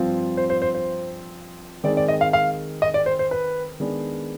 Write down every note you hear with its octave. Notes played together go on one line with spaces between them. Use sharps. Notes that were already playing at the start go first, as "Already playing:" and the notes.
Already playing: G2 F3 C4 F4
C5
C5
C5
C5
D#3 G#3 C4 D#4 D5
D5
D#5
F5
F5
D#5
D5
C5
C5
B4
D#3 G#3 B3 D4